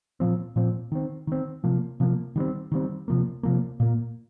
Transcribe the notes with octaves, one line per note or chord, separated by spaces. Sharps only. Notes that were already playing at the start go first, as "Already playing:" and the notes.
A#2 F3 C4
A#2 F3 C4
D#3 C4
D#3 C4
C3 F3 A#3
C3 F3 A#3
D#3 G3 C4
D#3 G3 C4
C3 F3 A#3
C3 F3 A#3
A#2 A#3